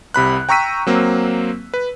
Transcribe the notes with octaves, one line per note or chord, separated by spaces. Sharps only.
C2 C3 B5 F#6
G5 A#5 C#6 E6 B6 D#7
F#3 A#3 C4
B4